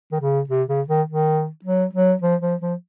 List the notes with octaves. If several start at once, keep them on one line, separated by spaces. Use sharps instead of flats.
D#3
C#3
C3
C#3
D#3
D#3
F#3
F#3
F3
F3
F3